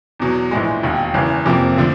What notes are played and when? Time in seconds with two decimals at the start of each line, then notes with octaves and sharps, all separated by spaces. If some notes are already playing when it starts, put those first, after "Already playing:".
0.20 E2 B2 F#3
0.51 A#1 A2 E3 G#3
0.83 E1 D#2 D#3
1.14 F#1 E2 C#3 E3
1.46 F1 F2 C3 F3 A#3
1.77 D3 F3 A3